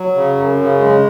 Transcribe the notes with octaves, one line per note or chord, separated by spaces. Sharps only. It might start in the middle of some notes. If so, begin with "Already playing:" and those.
Already playing: F#3
C#3
F#2
C#3
G#3